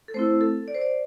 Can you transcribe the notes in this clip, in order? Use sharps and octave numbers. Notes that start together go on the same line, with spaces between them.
A4
A3 C4 E4 C5
A4
D5
C5
D5